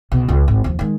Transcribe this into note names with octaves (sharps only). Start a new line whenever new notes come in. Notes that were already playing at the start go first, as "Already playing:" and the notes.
B1 B2
C#2
G#1
D#2 F3
D#3 G#3